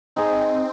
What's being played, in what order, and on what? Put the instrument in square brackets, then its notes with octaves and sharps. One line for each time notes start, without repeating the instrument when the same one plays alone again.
[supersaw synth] C4 [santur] D#4 G#4 D#5